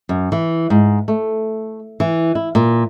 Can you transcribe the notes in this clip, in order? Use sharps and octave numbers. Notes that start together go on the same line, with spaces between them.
F#2
E3
G#2
A3
E3
E4
A#2